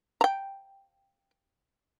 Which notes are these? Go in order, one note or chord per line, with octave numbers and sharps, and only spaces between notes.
G5 A#5